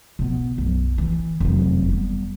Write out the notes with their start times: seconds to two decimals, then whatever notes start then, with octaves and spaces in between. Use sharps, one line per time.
0.19 B2 B3
0.58 B1 F#2
0.98 E3
1.40 F1 F#2
1.89 G3 B3